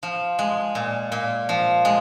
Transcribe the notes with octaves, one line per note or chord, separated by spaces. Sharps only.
F3
G#3
A#2
A#2
F3
G#3